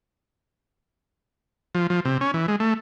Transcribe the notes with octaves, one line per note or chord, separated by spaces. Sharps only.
F3
F3
C3
C#4
E3
G#3
A3